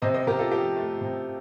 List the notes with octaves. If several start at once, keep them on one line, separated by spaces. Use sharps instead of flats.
C3 C5 D#5
C5 D#5
C3 G4 A#4
F4 A4
F3 G4
A3
C3